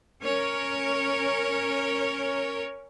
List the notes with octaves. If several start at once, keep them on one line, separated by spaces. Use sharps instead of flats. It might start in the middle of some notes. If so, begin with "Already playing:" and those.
C#4 A#4 C#5